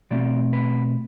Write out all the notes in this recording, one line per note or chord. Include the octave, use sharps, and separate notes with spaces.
B2 A3 C4 D5
B4